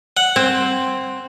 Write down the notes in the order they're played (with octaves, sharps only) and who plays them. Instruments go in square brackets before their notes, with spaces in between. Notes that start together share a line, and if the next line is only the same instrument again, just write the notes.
[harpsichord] F#5
[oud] C4